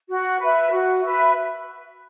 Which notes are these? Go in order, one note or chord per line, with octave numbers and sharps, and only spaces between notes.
F#4
B4 E5
F#4
B4 E5